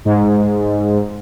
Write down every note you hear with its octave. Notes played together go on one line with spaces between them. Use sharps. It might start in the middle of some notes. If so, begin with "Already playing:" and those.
G#2